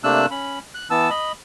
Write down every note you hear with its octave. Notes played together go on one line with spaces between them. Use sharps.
C3 A3 A#3 D4 E6 F#6
C#4 B5
F#6
E3 B3 A5 E6
D#5 B5